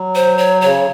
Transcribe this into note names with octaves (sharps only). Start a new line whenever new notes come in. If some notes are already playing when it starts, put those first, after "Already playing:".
Already playing: F#3
C5
C#5
C#3 C#5